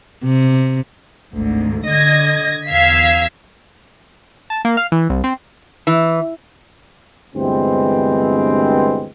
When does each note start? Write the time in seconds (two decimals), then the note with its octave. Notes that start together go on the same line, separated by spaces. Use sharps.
0.24 C3
1.34 G#1 D2 G#2
1.87 D3 D#5 G#6 A#6
2.69 E2 F5 E6 G#6 B6 C7
4.50 A5
4.65 A#3
4.77 F5
4.92 E3
5.09 C2
5.24 C4
5.87 E3
7.35 D2 G2 E3 G#3 B3 C4